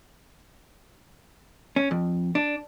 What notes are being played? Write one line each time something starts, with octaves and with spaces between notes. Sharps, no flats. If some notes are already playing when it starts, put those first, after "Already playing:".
C#4
F2
D4